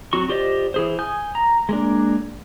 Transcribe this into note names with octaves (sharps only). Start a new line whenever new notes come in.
F#3 C4 F#4 C#6
F4 G4 C5 D5 D#5
E3 G#4 C5
G#5 D#6 G6
A#5
G#3 A#3 D4